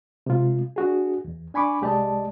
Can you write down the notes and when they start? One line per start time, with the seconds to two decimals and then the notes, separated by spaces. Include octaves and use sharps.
0.26 C3 G#3 F4
0.76 D4 F#4 G#4
1.25 E2
1.54 D4 G#5 B5 C#6 D6
1.81 C2 G#3 G4 D5 D#5 A5